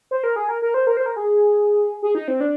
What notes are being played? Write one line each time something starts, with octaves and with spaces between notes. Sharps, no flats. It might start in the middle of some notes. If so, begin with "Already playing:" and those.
C5
A#4
G#4
A#4
A#4
C5
A#4
C5
A#4
G#4
G#4
D#4
C4
D4